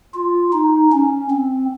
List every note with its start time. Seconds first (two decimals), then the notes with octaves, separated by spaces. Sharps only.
0.14 F4
0.53 D#4
0.92 C#4
1.31 C4